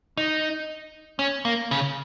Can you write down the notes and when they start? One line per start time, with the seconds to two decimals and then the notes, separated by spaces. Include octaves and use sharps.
0.17 D#4
1.19 C#4
1.45 A#3
1.71 C#3